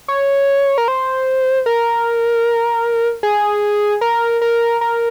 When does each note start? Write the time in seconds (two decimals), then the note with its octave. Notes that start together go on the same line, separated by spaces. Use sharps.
0.08 C#5
0.78 A#4
0.88 C5
1.66 A#4
3.23 G#4
4.01 A#4
4.42 A#4
4.81 A#4